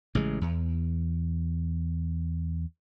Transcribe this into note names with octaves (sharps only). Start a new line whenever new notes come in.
A1 C#3 G#3
E2